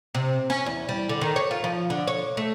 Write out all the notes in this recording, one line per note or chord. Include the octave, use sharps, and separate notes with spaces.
C3
C#4
E2
G3
D3
D#3
C#5
F4
F3
D3
C#5
A3